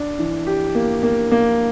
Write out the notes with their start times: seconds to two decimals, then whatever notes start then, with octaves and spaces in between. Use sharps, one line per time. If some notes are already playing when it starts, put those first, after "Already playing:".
Already playing: D4
0.19 E3
0.47 G4
0.75 A#3
1.03 A#3
1.31 A#3